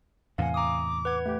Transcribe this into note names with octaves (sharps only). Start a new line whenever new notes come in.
E2 A2 C3 F5 F#5 G#5
A#5 D6 D#6
B4 F#5 G#6
A3 G4